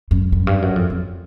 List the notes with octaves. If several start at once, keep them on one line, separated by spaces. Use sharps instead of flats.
F#2
F#2
G2
F#2
F2
F2